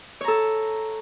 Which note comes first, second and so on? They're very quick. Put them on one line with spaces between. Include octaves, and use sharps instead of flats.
C#5 A#5 A4